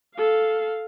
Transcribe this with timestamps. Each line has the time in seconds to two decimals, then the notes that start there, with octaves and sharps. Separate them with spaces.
0.16 A4 F5